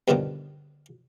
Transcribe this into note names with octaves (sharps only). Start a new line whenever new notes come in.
G2 B2 D3 D#3 F3